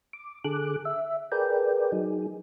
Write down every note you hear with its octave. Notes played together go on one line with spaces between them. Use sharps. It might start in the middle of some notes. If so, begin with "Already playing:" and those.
D6
D3 G#4 A4 D6 F#6
E5
G#4 A#4 B4 D5 G5
F#3 D#4 G#4